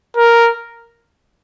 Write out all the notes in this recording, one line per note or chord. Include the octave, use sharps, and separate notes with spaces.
A#4